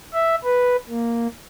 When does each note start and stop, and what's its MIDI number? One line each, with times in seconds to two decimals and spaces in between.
0.14 0.36 76
0.44 0.76 71
0.89 1.27 58